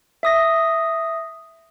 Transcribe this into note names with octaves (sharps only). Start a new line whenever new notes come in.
E5 D#6 A#6